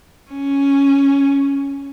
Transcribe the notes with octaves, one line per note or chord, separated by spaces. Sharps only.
C#4